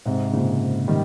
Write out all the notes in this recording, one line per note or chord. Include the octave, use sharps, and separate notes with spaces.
G#2 C3
A#2 C#3
D#3 G3